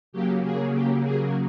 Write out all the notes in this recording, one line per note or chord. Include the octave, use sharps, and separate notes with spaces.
C#3 F#3 A#3 G4
G#4
G4
G#4